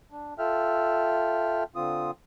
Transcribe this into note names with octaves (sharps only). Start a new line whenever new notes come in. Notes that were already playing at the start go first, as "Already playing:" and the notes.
D4
F4 A4 E5 G5 F6
D3 C4 F4 D#6